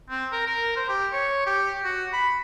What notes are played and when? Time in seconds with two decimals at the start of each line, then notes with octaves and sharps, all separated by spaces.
0.10 C4
0.32 A#4
0.47 A#4
0.77 C5
0.89 G4
1.13 C#5
1.47 G4
1.84 F#4
2.13 B5